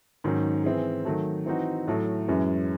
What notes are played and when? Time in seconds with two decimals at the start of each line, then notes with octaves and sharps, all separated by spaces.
0.24 G#2 D#3 F#3 C#4
0.64 E3 C4 E4 G#4
1.05 D#3 F#3 A3
1.46 E3 C4 D#4 F#4
1.88 A2 F#3 A3
2.28 F#2 E3 G#3 C#4